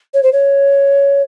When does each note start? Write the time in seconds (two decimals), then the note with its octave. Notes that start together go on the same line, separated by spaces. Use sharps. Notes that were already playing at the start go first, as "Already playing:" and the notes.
0.14 C#5
0.23 C5
0.32 C#5